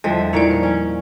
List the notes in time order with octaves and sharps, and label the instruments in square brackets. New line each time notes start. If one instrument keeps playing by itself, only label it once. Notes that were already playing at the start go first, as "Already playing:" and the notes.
[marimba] E2 G3 D#5 [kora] D3 F3 E5
[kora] A#2 D#3 C#5 [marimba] E4 D5
[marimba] F3 C5
[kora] C#4